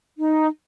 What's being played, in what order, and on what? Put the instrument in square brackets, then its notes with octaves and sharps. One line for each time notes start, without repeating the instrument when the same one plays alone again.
[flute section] D#4